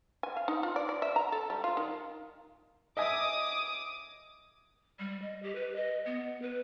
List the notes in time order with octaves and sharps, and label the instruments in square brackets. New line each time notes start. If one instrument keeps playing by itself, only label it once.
[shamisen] G#5
F5
D#4
F4
D5
D5
E5
A#5
A4
G3
F4
D#3
[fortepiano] D#5 E5 G#5 [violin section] D6 D#6
[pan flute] G3
D#5
G4
B4
D#5
B3
B4